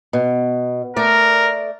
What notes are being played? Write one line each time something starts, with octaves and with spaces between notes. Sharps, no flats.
B2
A3 A#4 D5